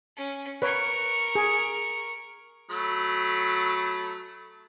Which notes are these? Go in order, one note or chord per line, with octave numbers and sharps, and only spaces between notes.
C#4
A#4 B4 C#5 C#6
G#4
F#3 A3 B5